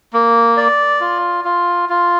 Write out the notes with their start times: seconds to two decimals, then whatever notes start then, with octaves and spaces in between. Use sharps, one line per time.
0.13 A#3
0.57 D5
1.00 F4
1.45 F4
1.89 F4